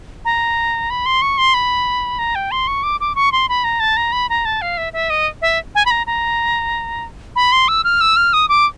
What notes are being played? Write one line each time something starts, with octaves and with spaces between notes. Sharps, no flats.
A#5
B5
C6
C#6
C6
B5
A#5
G5
C6
C#6
D6
D6
C#6
C6
B5
A#5
A5
A#5
B5
A#5
A5
F5
E5
E5
D#5
E5
G#5
B5
A#5
A#5
B5
C6
E6
F6
E6
F6
D#6
D6